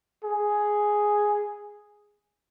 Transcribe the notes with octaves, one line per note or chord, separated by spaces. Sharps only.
G#4